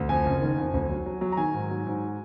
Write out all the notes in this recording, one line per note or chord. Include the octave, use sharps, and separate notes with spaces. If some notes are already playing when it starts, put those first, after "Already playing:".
Already playing: D2
F2 G#5
F#1
D#3
F2
D2
F#3
F#3
F#3
A#5
D#3 G#5
G#2
F#3
G#2